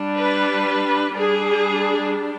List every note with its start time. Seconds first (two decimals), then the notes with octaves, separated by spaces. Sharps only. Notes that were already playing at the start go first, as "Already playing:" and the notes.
Already playing: G3 D4
0.16 B4
1.16 G3 D4 G#4